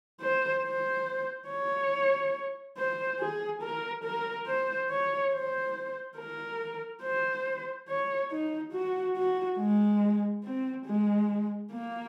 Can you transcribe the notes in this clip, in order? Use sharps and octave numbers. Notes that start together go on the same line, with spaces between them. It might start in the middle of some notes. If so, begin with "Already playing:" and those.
C5
C5
C#5
C5
G#4
A#4
A#4
C5
C#5
C5
A#4
C5
C#5
D#4
F#4
F#4
G#3
C4
G#3
A#3